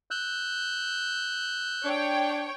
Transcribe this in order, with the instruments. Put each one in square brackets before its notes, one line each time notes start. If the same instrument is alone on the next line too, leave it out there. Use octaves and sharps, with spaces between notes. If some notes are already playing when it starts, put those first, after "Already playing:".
[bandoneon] E6 F#6 G6
[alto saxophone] D4 [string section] C#5 G5